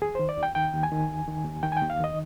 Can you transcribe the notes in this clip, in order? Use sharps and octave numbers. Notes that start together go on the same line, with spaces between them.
D#2 G#4
D#3 C5
D5
D#2 G5
D#3 G5
D#2
G#5
D#3
D#2
D#3
D#2
D#3 G5
G#5
D#2 G5
F5
D#3 D#5